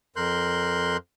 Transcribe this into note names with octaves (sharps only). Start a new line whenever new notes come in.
F2 A#4 C6 F#6 G6